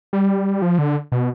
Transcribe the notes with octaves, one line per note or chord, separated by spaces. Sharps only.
G3
F3
D3
B2